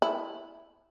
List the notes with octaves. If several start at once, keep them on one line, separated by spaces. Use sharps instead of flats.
E4